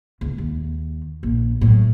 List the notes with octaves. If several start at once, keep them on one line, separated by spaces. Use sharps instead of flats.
C#2
D#2
A#1
A2 F#3